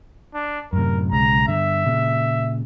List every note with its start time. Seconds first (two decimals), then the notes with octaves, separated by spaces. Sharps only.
0.34 D4
0.73 F#2 A2 C3 A#4
1.12 B1 C#3 G#3 A#5
1.48 G2 D3 E5
1.86 A#2 C#3